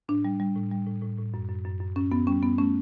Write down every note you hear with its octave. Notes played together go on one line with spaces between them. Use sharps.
A2 D4
G3
G3
A2
G3
A2
A2
A2
F#2
F#2
F#2
F#2
F#2 C#4
F#2 B3
G3 C#4
F#2 B3
A3 C#4